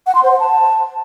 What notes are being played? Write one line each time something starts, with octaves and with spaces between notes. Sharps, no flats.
F#5
C6
C5
F#5
A5